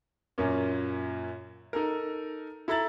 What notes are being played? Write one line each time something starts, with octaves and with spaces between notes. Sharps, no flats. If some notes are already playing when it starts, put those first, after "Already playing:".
F#2 A#2 A#3 C#4
D#4 A4 A#4
E4 A4 A#5 E6 A6 F#7